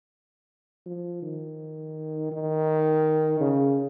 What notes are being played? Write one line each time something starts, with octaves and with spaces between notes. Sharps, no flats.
F3
D#3
D#3
C#3